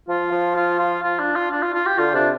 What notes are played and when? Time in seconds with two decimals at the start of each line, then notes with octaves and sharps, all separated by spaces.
0.09 F3 F4
0.32 F3
0.56 F4
0.79 F4
1.03 F4
1.19 D4
1.36 F4
1.51 D4
1.63 F4
1.74 F4
1.86 G4
1.98 D3 F4
2.14 C3 D4